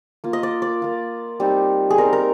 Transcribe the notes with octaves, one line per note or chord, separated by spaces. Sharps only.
A#3 F4
D#5
D5
D5
A#3 F4
G3 C4 D#4
G#4
G3 C4 D#4 A#4
A#4